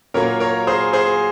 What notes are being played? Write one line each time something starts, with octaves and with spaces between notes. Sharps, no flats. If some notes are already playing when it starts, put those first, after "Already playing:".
A#2 F#3 A#3 A#4 C#5
A#4 C#5
G#4 C5
G#4 C5